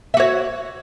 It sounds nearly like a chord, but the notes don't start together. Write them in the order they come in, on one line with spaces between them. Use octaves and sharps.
E5 F#4 C#5